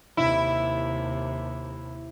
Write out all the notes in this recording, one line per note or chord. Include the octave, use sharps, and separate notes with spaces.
D#2 C3 E4